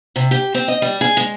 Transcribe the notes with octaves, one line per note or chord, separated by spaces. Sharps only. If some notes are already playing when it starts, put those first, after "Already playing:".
C3
G4
C4
D#5
G3
G#4
G#3